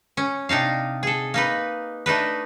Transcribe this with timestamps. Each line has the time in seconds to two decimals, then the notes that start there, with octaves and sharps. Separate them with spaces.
0.17 C#4
0.49 C3 D4 D#4 F5
1.03 G#4 A4
1.34 A#3 D#4 B4
2.06 A3 D4 D#4 B4